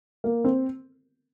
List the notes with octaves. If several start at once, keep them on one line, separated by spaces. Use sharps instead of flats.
A#3
C4